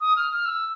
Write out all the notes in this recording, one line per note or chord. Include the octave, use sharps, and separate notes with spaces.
D#6
F6
F6
E6